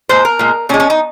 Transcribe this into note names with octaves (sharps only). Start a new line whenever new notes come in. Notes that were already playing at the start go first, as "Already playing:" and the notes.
A#2 G#3 C5
A#4
A#2 G#3
A#2 G#3 C#4
C#4
D#4